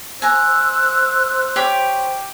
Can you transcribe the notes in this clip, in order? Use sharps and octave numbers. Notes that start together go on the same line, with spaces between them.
C5 G#5 A#5 E6 F#6
G4 C#5 B5